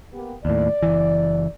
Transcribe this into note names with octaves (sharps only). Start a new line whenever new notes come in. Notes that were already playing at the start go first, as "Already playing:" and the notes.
A#3 B3 G4
D#2 A2 D5
F#1 C2 E3